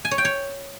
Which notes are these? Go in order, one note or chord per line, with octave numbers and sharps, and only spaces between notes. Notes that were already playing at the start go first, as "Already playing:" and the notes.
G#5
C#5
G5
C#5